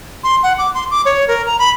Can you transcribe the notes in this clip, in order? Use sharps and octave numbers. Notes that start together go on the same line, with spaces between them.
C6
F#5
D6
C6
D6
C#5
A#4
A#5
B5